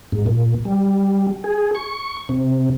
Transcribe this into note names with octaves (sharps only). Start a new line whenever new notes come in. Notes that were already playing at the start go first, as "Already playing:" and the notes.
G#2
A#2
G3
G#4
C#6
C3